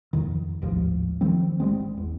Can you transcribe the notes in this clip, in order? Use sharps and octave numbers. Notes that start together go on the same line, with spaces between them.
F2 D#3
A1 D#2 G#2 F3
D#3 F3 G3 C4
G#1 G3 G#3 C4
E2